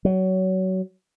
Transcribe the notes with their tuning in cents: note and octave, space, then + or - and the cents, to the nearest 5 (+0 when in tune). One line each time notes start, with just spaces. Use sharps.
F#3 +25